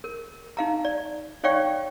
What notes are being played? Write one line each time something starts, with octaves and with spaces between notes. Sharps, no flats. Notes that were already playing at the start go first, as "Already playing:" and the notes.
A#4
D#4 F5 A#5
D5
D#4 C#5 D5 F5 G5 C#6